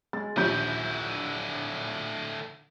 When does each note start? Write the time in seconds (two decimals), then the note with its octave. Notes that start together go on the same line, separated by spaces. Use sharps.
0.13 G#3 A6
0.37 A#1 D#2 D3 F3 E4 G6